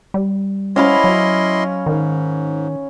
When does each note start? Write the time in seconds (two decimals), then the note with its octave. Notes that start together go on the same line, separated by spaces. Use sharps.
0.14 G3
0.76 C#4 E4 D#5 F5 B5 C6
1.04 F#3
1.86 G#2 D#3